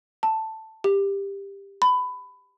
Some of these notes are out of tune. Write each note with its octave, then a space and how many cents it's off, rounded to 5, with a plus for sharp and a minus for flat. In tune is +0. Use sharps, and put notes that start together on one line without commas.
A5 +5
G4 +15
B5 +20